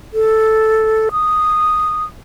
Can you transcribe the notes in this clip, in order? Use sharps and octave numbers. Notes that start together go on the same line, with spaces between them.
A4
D#6